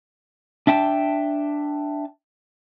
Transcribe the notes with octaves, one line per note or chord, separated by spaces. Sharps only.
D4 E5 G5 A5